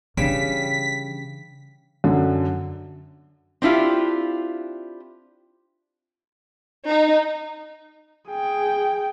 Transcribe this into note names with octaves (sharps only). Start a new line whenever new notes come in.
C#3 E3 G3 D4 B6
F#2 D3
C4 D4 E4 F4 G4
D#4
G#4 G5